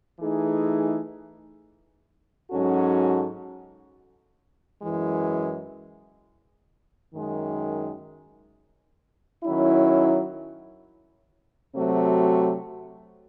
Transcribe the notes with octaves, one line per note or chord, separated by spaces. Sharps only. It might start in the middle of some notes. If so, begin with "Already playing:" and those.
E3 A3 D#4 G#4
G#2 F#3 C#4 F#4 A4
F#2 E3 G#3
F#2 D#3 G#3
D#3 F#3 C#4 E4
C3 F#3 A3 C4 F#4